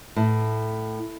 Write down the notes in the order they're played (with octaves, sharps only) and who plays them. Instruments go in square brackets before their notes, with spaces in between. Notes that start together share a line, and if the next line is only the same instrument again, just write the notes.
[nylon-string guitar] A2